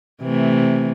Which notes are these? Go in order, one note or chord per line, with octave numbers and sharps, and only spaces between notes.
C3 E3 A3